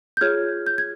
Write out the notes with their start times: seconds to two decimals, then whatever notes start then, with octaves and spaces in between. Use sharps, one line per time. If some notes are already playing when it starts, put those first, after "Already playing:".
0.17 G6
0.21 F4 G#4 C#5 F6 G#6
0.67 G6
0.78 G#6